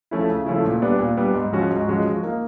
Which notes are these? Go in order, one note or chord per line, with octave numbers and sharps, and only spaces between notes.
F3 A3 C#4 E4
C#3
F3 A3 C#4 E4
A#2
G3 B3 D4
A#2
G3 B3 D4
G#2
F3 G#3 C#4 F#4
G#2
F3 G#3 C#4 F#4
F3
A#3 D#4